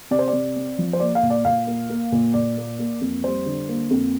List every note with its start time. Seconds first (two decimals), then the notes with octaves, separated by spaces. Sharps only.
0.11 C3 D5
0.19 C5
0.28 D5
0.33 C3
0.56 C4
0.78 F3
0.93 C5
1.00 A#3 D5
1.15 F5
1.23 A#2
1.30 D5
1.45 A#2 F5
1.67 A#3
1.90 A#3
2.12 A#2
2.34 A#2 D5
2.57 A#3
2.79 A#3
3.01 F2
3.24 G3 C5
3.46 D3
3.69 A#3
3.90 F2